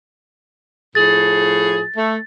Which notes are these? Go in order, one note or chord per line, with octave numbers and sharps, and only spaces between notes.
A2 F3 G#4 A6
A3